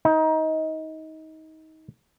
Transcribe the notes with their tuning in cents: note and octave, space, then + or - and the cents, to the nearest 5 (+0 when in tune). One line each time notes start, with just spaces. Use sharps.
D#4 +25